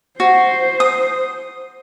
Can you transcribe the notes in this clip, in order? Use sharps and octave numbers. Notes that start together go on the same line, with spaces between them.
F#4 C5
D#6